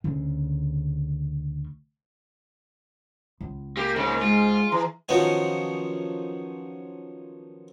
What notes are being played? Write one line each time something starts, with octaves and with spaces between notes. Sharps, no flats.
D2 C#3
C#2
A#3 G4
G#2 C#3 A#3
G#3 F4
E3 A#5
D#3 F3 F#3 B3 C#4 D#4